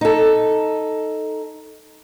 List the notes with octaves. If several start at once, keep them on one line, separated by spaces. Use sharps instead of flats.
D#4 A4